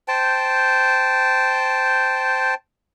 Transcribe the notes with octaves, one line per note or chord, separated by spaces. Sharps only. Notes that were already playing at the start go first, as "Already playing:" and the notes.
C5 G5 A5